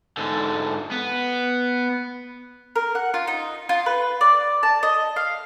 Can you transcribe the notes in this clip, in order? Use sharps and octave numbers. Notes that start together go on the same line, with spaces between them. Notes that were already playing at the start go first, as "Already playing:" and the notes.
G#2 D3
B3
A#4
F#5
F4
D#4
F4
B4
D5
A5
D#5
F5